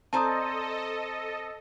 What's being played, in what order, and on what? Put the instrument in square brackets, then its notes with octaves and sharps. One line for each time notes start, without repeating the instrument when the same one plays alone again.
[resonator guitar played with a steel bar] C4 C5 D5 [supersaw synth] A4 D#5 [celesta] A5 A#5 D#6